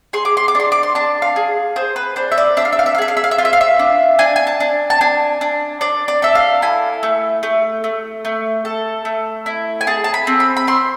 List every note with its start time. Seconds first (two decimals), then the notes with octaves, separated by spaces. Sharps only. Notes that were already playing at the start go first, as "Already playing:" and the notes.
0.13 G#4 C6
0.25 D6
0.37 C6
0.48 D6
0.55 D4 C6
0.72 D6
0.83 C6
0.95 D4 A5
1.22 F5
1.36 G#4
1.76 G#4 C5
1.96 B4
2.16 D4 C5
2.32 E5
2.38 D5
2.57 D4 E5
2.65 F5
2.73 E5
2.79 F5
2.86 E5
2.95 F5
2.98 G#4 E5
3.08 F5
3.17 E5
3.24 F5
3.31 E5
3.38 F4 F5
3.45 E5
3.53 F5
3.61 E5
3.79 D4
4.19 D4 G#5
4.36 G#5
4.47 A5
4.60 D4
4.90 A5
5.01 D4 G#5
5.41 D4
5.81 D4 D5
6.08 D5
6.22 A4 E5
6.35 F5
6.62 E4 G#5
7.03 A3
7.43 A3
7.84 A3
8.25 A3
8.65 A4
9.05 A3
9.46 E4
9.81 G#5
9.87 G#4 A5
10.04 A5
10.14 B5
10.27 C4
10.40 B5
10.57 B5
10.67 C4 C6